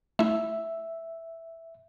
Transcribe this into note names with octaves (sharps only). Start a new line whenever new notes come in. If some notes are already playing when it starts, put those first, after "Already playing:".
A3 E4 E5